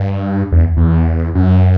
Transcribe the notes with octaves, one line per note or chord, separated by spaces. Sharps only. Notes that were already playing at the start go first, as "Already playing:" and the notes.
Already playing: G2
E2
E2
F#2